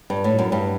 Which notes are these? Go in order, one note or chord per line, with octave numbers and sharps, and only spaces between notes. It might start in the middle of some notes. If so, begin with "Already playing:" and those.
G2
A2
F#2
G2